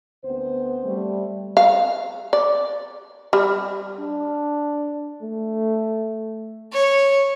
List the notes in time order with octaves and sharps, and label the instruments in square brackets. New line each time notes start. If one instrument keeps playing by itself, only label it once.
[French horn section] D2 B3 C4 C5
G3 A3
[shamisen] F5
D5
G3
[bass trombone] D4
[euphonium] A3
[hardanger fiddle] C#5